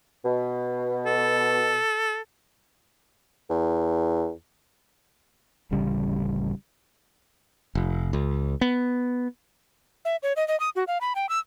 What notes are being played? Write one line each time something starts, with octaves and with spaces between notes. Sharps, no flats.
B2
A4
E2
D1 A1 C#3 G3
F1
C#2
B3
E5
C#5
D#5
D#5
D#6
F#4
F5
B5
G5
E6